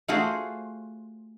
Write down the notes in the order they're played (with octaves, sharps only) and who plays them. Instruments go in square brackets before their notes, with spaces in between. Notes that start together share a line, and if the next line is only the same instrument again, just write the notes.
[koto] A3 F4 F#4 G#4 C5